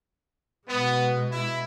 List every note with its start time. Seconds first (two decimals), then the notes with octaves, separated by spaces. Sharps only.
0.67 B2 G#3 B3
1.32 E4